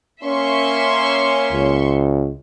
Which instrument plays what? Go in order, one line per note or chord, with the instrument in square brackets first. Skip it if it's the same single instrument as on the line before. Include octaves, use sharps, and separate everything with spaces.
[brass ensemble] A#3 C#4 [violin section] E5 C6 C#6
[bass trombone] C#2